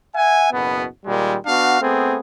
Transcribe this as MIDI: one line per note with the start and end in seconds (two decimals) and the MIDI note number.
0.15 0.51 76
0.15 0.51 78
0.15 0.51 80
0.52 0.85 30
0.52 0.85 47
0.52 0.85 59
1.06 1.36 46
1.06 1.36 51
1.06 1.36 55
1.06 1.36 56
1.46 1.80 59
1.46 1.80 62
1.46 1.80 66
1.46 1.80 77
1.81 2.20 57
1.81 2.20 59
1.81 2.20 60
1.81 2.20 68